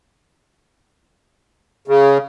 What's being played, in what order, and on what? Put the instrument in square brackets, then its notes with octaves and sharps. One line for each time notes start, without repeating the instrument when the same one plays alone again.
[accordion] C#3